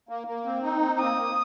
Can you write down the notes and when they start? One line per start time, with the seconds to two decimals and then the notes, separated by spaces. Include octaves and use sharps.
0.09 A#3
0.27 A#3
0.45 C4
0.63 D#4
0.81 C4
0.99 A#3 D#6
1.17 A#3